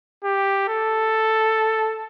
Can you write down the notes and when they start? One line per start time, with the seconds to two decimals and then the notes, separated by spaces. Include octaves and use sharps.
0.24 G4
0.68 A4